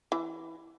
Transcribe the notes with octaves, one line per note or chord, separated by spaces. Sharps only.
E3